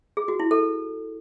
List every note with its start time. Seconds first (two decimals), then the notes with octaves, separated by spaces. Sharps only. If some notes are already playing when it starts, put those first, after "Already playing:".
0.17 G#4
0.28 F#4
0.40 E4
0.51 A4